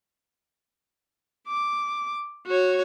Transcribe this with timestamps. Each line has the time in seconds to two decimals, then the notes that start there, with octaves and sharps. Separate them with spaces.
1.48 D6
2.46 F#4 C#5